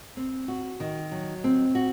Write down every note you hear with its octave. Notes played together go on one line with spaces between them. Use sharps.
C4
F#4
D#3
F#3
C4
F#4